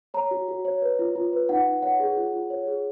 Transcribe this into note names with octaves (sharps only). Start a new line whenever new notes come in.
C#5 A#5
F#4
F#4
C#5
B4
F4
F4
B4
D#4 F#5
D#4
C#5 F#5
G#4
F4
F4
C#5
G#4